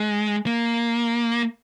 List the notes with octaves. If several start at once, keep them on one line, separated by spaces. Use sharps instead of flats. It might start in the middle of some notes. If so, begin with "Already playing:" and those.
Already playing: G#3
A#3